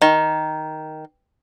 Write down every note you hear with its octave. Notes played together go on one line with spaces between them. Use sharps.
D#3